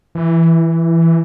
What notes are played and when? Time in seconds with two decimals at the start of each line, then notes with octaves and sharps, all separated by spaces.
0.15 E3